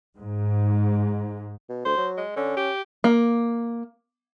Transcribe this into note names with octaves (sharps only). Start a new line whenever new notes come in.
G#2
B2
D2 C5
F#3
G#3
D3 C#4
G4
A#3